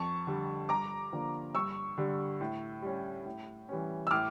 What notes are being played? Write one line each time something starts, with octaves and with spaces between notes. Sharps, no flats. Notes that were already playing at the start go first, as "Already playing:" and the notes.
Already playing: F2 A5 C#6
D3 G3
G2 A#5 D6
D3 F3 A#3 D4
G2 C#6 E6
D3 G3
A2
G3 C#4
A2
E3 G3 C#4
E6
A2 D6 F6